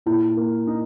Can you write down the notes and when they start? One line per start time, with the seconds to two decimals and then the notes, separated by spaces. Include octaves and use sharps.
0.06 A#2 E4
0.37 A#3
0.67 D#4